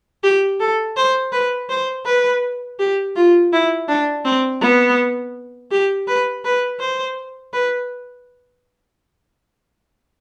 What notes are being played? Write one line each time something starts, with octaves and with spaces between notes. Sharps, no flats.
G4
A4
C5
B4
C5
B4
G4
F4
E4
D4
C4
B3
G4
B4
B4
C5
B4